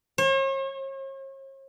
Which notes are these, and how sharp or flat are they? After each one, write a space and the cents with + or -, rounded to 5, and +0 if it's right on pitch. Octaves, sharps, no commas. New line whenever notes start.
C#5 -45